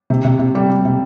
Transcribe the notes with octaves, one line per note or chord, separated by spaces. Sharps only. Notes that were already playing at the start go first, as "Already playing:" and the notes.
C3
C3
C3
G3
G3
C3